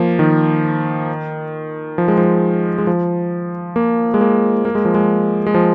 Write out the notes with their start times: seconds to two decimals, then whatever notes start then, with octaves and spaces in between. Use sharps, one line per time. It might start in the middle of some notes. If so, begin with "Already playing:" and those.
Already playing: F3 A#3
0.19 D#3
1.98 F3
2.08 G#3
2.18 F3
2.78 G#3
2.87 F3
3.76 A#3
4.14 G#3
4.21 A#3
4.65 A#3
4.75 G#3
4.85 F3
4.94 G#3
5.47 G#3
5.54 F3